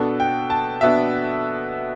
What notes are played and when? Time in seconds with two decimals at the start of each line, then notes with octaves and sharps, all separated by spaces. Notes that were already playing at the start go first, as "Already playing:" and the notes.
Already playing: B2 B3 D4 A4
0.20 G5
0.50 A5
0.81 B2 B3 D4 E5